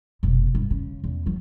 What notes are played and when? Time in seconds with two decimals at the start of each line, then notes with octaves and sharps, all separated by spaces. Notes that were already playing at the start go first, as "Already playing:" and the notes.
0.23 F1 B2
0.55 G2
0.70 C#3
1.04 E2
1.26 D#3 F#3